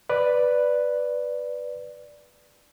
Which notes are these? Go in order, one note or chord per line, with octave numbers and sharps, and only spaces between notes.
B4 D5